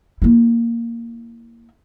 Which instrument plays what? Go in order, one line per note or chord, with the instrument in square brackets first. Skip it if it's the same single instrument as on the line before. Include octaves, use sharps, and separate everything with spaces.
[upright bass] A#3 E4